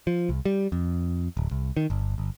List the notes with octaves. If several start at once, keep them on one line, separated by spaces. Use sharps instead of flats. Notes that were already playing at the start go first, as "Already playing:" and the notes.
F3
C2
G3
F2
D1
C2
D#3
G1
G1